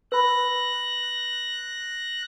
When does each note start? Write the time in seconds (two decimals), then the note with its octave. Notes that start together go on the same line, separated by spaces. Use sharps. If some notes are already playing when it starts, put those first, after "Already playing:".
0.12 B4 B5 F#6 A#6